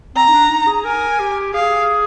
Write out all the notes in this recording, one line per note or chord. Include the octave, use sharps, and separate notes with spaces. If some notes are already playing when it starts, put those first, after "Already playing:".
C4 A#5
D#4
D4
D#4
G#4
A#4 G#5
G4
G#4 F5